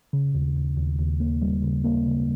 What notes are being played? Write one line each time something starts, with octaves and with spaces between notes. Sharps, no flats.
C#3
D#2
D#2
D#2
D#2
A#3
G3
C#3
A#3
C#3